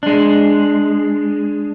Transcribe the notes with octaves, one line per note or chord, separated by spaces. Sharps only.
G#3 D4